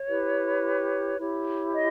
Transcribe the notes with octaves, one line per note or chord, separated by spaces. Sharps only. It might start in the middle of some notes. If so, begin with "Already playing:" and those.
Already playing: C#5
E4 G4 B4
E4 G4 C#5
D#5